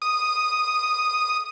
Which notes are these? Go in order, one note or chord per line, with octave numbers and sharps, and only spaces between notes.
D#6